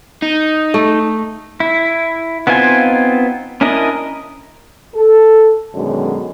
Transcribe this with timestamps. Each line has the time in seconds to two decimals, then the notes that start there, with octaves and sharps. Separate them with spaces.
0.22 D#4
0.74 A3
1.60 E4
2.47 B3 C4 D#4 F4 G#5
3.61 C#4 D4 E4 A#4 D#5
4.94 A4
5.74 F#2 B2 D3 D#3 G#3